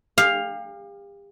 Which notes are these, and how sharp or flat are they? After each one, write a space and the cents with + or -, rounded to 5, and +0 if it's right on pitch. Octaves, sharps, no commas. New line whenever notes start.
G4 +40 F5 +5